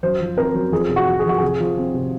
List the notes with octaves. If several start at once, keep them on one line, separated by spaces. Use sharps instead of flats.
F#2 C5
F3
C4 A#4
F#2
F2 G#4
C3
F#4
F3
G#4
F2 F#4
C3 G#4
F3
C4
C3